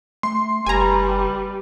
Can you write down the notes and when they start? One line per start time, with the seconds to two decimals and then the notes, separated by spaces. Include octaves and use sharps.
0.23 A3 C6
0.66 F#1 G3 B4 G#5 A#5